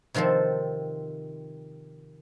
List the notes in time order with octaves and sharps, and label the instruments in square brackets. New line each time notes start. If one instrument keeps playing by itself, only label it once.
[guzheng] C3 D#3 F3 C4 A4